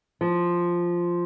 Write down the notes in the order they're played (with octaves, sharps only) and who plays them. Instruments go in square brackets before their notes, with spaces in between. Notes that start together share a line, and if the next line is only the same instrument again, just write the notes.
[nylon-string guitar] F3